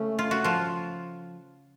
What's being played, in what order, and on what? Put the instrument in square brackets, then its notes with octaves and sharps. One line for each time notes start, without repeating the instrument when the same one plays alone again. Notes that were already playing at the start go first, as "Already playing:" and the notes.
Already playing: [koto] C#3 C#4 [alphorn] A3
[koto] F4
F#4
F3 F4